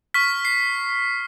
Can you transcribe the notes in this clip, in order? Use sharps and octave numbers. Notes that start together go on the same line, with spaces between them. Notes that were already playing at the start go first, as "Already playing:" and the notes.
C#6 F6 B6
C7